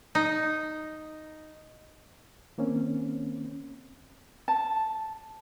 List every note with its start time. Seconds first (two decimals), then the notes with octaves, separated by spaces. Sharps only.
0.15 D#4
2.58 D#3 A#3 C4 C#4
4.48 A5